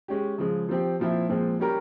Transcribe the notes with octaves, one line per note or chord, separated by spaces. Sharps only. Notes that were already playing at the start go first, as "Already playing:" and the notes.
G#3 C#4 G4
C#3 F3 G#3
F3 C4 G4
A#2 F3 C4 E4
A#2 F3 G#3 C4
G3 C#4 G4 A#4